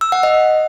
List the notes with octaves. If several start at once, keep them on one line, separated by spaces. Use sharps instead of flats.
E6
F#5
D#5